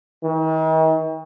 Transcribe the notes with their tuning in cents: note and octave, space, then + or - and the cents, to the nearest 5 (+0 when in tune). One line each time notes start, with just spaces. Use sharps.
D#3 +45